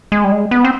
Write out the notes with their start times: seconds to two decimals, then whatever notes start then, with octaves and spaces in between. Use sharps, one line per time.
0.12 G#3
0.24 G3
0.32 G#3
0.51 B3
0.64 C4